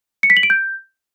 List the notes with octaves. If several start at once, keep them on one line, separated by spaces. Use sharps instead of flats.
C#7
B6
F#7
D7
G6